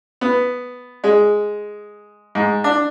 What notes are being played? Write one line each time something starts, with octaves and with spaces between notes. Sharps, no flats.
B3
G#3
G#2
D4